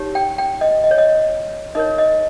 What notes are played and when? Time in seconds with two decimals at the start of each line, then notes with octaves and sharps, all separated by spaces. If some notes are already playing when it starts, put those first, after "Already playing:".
Already playing: D#4 G4 C#5
0.15 G5
0.38 G5
0.61 D#5
0.84 D#5
0.91 C#5
0.98 D#5
1.75 D#4 A#4 C#5 D#5
1.98 D#5